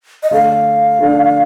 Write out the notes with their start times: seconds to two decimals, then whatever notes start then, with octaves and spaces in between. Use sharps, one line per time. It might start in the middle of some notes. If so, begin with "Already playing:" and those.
0.23 D#5
0.31 D3 A3 D4 F5
0.99 D3 A3 D4